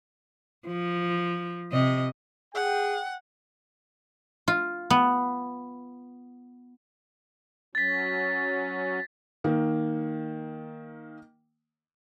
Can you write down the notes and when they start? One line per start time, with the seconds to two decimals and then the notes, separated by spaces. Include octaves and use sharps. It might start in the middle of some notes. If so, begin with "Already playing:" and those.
0.67 F3
1.72 C3 D#5
2.55 G#4 F#5 G5
4.48 F4
4.90 B3
7.75 F#3 C#4 A6 B6
9.44 D#3 A#3